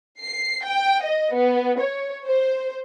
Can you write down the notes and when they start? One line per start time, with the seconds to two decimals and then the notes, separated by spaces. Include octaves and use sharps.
0.22 C7
0.65 G5
1.04 D#5
1.33 B3
1.79 C#5
2.25 C5